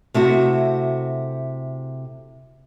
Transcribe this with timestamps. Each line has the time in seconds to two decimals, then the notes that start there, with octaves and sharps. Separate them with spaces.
0.14 C3 A3 E4 F#4